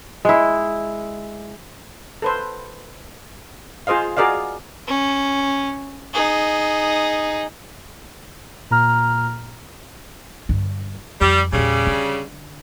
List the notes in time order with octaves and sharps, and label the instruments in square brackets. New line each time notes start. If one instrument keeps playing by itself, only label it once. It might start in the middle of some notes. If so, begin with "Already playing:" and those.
[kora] G#3 E4
[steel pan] A4 B4 C5
F4 G#4 C5 D#5 F5
F#4 G#4 A#4 D5 D#5 F5
[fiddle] C#4
D#4 G#4
[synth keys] A#2 A#5 F6
[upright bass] G2 D3
[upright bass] F2 [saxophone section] G3
[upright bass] E2 A#2 [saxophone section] C#3 G3
[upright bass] D3